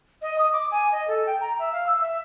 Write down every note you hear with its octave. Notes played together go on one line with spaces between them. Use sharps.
D#5
D#6
D6
G#5
D#5
A4
G5
A#5
E5
F5
E6
E5